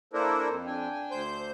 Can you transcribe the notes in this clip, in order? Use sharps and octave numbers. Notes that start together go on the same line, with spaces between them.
A#3 D4 E4 A4 A#4 C5
F2
D4 G5 G#5
D2 C5 G6